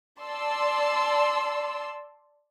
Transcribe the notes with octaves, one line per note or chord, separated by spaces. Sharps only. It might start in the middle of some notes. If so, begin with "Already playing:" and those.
D5 A5 C6 E6